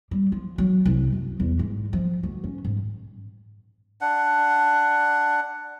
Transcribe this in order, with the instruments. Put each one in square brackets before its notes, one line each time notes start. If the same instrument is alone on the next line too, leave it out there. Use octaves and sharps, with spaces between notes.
[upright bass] G3
F3
F#3
C2
F#2
E2
G#2
F3
D2
C#4
G#2
[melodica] D4 F#5